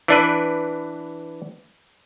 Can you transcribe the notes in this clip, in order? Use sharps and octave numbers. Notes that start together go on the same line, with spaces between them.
E3 D4 B4